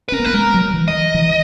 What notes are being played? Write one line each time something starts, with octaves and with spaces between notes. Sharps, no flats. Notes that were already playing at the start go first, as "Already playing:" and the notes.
B4
C#4 A#4
B3
A#3 B4
G#3 A#4
F#3
E3
D#5
E3